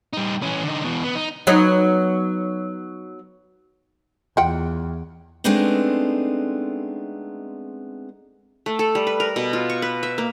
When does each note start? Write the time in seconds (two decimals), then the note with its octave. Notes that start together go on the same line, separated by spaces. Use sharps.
0.13 G3 D#4
0.42 E3 C#4
0.64 D3 D#4
0.84 B2 E3
1.03 B3
1.15 D#4
1.47 F#3 B3 D#4
4.37 E2 F4 F#5 G5
5.44 G#3 A3 B3 C4 D4 D#4
8.66 A3
8.79 A4
8.95 G3
9.07 B4
9.20 A#4
9.36 B2
9.53 F4
9.70 C#6
9.82 B4
10.03 E5
10.18 A#3